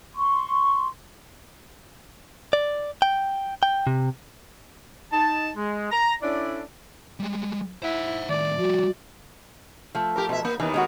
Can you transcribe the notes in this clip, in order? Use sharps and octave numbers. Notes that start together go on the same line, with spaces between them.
C6 C#6
D5
G5
G5
C3
D#4 A5
G#3
A#5
C#4 D4 E4 A4 D5
G3 G#3
E4 C5 F#5
A2 D#3 D5
F3 G3 F#4
F3 A3
G4 A#4
B2 E5
A#3
D#2 D#3 E3 B3
G#3 D#4 F#4